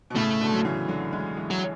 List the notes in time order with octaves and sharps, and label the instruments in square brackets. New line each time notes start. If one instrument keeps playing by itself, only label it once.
[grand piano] B2
[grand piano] A2 C#3 [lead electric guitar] A3
[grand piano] B2 D3
F#3
C#3 E3
D3 F#3
E3 G#3
E3 G#3
[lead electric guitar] F#3